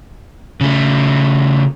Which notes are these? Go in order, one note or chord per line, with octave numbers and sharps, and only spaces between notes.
C#3 A3